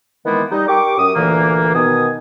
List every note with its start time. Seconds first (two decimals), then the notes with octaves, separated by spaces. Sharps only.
0.25 D#3 E3 G#3 A#3 B3
0.51 G3 D#4
0.68 G4 A#4 C#6 D6
0.98 F#2 D#6
1.16 D2 A#2 E3 A#3
1.74 B2 D#3 B3 G#5 D#6